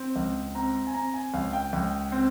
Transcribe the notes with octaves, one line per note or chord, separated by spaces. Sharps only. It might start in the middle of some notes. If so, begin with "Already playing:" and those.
Already playing: C4
C#2
C4 A#5
G#5
C4 A#5
G#5
C#2 F5
G5
C#2
C4